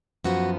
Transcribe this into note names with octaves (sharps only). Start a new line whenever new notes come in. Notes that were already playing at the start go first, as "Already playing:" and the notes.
F#2 F3 B3 F#4